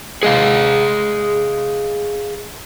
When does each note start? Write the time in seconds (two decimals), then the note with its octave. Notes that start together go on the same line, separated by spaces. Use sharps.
0.23 G#4 D#5 F5